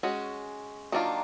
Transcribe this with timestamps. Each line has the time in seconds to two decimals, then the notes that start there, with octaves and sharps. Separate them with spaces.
0.03 G#3 C#4 F#4
0.92 D#3 F#3 A#3 D4 F4